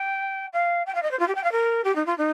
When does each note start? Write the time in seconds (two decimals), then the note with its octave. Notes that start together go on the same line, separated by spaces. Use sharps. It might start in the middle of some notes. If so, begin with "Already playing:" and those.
Already playing: G5
0.53 F5
0.86 G5
0.95 F5
1.02 D#5
1.11 C5
1.19 F4
1.28 G4
1.35 G5
1.44 F5
1.52 A#4
1.84 G4
1.95 D#4
2.06 F4
2.18 D#4